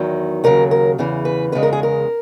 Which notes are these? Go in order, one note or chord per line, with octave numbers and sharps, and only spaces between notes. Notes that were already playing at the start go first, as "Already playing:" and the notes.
Already playing: E2 D#3 F#3
D#2 C#3 F#3 A#4
A#4
E2 C#3 E3
B4
E2 C#3 G#3 B4
A#4
G#4
A#4